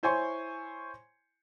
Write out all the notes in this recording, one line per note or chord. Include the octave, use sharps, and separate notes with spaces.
E4 C5 C#5 G#5 C6 C#6